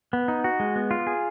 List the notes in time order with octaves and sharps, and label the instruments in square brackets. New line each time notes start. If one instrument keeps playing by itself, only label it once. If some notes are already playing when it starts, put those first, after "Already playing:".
[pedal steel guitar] B3
D#4
F#4
G#3
B3
F4
G#4